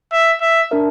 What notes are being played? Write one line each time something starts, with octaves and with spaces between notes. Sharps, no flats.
E5
E5
D4 A#4 E5